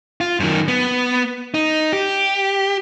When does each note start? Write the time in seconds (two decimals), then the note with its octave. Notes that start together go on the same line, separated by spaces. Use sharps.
0.21 F4
0.40 F#2 D#3
0.68 B3
1.54 D#4
1.93 G4